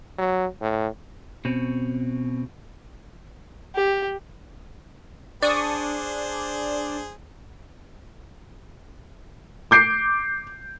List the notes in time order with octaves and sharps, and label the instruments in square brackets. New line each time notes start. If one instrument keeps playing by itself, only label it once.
[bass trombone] F#3
A2
[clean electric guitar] B2 C4 C#4
[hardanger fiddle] G4
[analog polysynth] D4 [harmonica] G#4 C5 [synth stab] D5 C#6 D#6
[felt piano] D6 G6 C7 D7